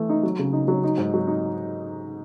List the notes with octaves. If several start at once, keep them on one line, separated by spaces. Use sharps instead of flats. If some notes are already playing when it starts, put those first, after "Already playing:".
Already playing: E3 A3
D#4
F#3
C#3
D#4
F#3
D#4
G#2
F#3
D#4